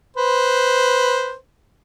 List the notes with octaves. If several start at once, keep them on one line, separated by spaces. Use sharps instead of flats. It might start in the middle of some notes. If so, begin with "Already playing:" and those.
B4 C5